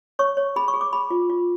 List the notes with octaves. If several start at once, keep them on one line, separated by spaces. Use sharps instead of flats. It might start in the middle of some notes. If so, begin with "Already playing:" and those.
C#5 C#6
C#5
G#4 B5
C#6
G#4
D6
G#4 B5
F4
F4